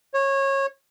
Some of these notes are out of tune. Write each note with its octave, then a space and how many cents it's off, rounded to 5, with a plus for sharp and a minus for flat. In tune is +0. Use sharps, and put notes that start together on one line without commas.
C#5 -20